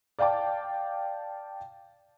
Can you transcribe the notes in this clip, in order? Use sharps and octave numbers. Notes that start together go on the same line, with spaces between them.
D5 F5 G5 A5 D6